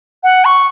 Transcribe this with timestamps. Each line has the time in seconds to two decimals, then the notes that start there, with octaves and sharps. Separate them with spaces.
0.23 F#5
0.45 C#6